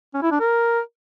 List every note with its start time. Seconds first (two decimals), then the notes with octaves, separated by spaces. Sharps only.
0.14 C#4
0.23 E4
0.31 D4
0.40 A#4